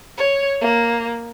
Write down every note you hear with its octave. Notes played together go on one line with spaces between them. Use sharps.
C#5
A#3